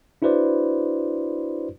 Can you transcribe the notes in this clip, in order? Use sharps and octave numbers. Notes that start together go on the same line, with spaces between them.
D4 E4 F#4 B4 C5 D5